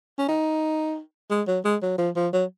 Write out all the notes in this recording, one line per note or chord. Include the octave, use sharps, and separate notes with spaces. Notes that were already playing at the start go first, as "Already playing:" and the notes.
C#4
D#4
G#3
F#3
G#3
F#3
F3
F3
F#3